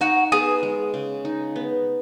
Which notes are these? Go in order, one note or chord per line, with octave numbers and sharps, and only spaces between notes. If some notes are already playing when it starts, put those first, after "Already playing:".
D#4 F#4
B3 G#4
G#3
C#3
D#4
B3